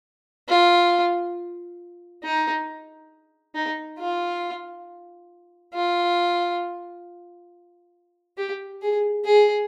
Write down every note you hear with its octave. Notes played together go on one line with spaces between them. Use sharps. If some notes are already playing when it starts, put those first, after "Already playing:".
F4
D#4
D#4
F4
F4
G4
G#4
G#4